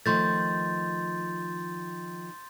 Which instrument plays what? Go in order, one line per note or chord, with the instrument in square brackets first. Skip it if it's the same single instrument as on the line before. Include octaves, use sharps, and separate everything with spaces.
[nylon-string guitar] D#3 F3 A3 [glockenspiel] C6 G6 A6